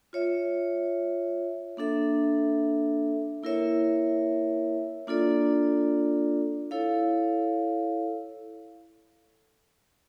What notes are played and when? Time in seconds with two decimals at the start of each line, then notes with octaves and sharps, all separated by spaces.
0.13 F4 C#5 E5
1.77 A#3 D4 A4 E5
3.43 A#3 E4 A#4 C#5 E5
5.07 A#3 D4 F4 A4 D5
6.71 E4 A4 C#5 F5